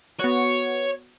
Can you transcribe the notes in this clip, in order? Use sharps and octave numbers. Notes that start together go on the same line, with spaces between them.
B3 F#4 C#5